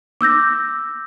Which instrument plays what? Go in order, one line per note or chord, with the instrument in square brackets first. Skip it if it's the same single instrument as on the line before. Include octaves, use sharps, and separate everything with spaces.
[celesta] D6 E6 G6 A#6